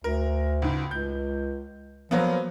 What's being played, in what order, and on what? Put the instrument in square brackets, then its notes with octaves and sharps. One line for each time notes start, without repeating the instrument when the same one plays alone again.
[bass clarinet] D2 [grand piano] A#4
[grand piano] C#2 G#2
[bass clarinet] C#2 [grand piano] G6
[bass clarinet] F3 [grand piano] F#3 A#3 B3